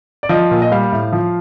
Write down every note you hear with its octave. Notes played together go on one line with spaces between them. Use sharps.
D5
F3 D#5
A#2
D#5
G3 F5
A2
F3